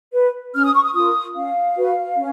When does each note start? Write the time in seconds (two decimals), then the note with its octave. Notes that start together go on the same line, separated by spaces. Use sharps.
0.14 B4
0.54 C#4 F6
0.64 D#6
0.74 C#6
0.84 D#6
0.94 F4 A#4 D#6
1.35 C#4 F5
1.76 F#4 B4
2.17 C#4